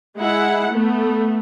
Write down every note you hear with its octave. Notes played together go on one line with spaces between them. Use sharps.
G#3 E4 F#5
A3 B3